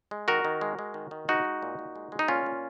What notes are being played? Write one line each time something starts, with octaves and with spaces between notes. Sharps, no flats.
G#3
D#3 F#4 A#4
D#3
G#3
G#3
D#3
D#3
G#3 D#4 F#4
G#3
A#2
A#2
G#3
G#3
D#4
A#2 C#4 F4
A#2